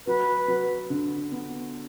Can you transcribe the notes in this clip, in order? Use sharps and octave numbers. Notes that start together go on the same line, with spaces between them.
F#3 B4
F#3
D3
B3